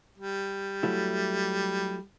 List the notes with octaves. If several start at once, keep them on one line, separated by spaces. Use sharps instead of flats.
G3
F#3 A3 E4